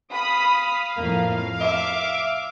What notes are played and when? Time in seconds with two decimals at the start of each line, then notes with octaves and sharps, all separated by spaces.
0.12 F5 B5 D#6
0.97 F2 A2 A#3
1.60 E5 D6